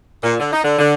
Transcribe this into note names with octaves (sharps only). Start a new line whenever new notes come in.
A#2
D3
D#4
D3
D3